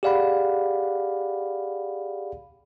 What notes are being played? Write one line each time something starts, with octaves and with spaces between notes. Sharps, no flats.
G4 G#4 D5 F5 F#5 B5